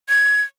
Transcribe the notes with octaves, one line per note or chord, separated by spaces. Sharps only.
G#6